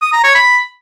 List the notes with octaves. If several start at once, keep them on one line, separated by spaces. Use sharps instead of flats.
D#6
A#5
C#5
B5